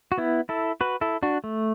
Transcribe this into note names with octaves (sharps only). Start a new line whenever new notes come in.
F#4
B3 E4
E4 A4
F#4 B4
E4 A4
D4 F#4
A3